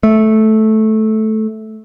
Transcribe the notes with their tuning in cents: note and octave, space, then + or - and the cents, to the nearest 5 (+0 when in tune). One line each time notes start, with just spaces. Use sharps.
A3 -10